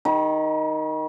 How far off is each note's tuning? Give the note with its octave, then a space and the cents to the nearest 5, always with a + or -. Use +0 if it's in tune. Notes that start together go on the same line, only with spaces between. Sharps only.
D#3 +0 B5 -45